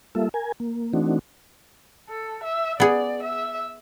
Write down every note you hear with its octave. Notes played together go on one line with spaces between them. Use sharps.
G3 A#3 F4 A4 E5
A#4 G#5
A#3
E3 A3 C4 D4 D#4 F#4
A4
E5
B3 G#4 D5
E5